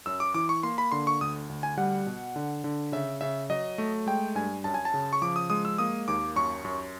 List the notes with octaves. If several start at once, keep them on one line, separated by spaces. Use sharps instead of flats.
F#2 E6
D6
E3 D6
C#6
A#3 C6
B5
D3 C6
C#6
D2 D#6
D2
G#5
G3 F#5
B2
D3
D3
C#3 E5
C#3 E5
F#3 D#5
A3
G#3 G5
G2 G#5
F#2 A5
G#5
A5
C#3
C#6
F3 D6
D#6
G#3 D#6
E6
A#3 D#6
D#2 D6
F#2 C#6
F#2